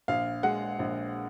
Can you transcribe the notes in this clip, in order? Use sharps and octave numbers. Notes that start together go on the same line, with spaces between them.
A#1 F5
G#3 F#5
A#1